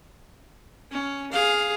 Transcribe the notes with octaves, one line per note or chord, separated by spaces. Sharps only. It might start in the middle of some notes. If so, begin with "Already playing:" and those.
C#4
G#4 F5